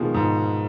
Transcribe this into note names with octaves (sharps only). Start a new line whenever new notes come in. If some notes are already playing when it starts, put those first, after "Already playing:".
Already playing: B2 D#3 F3 G#3
G#2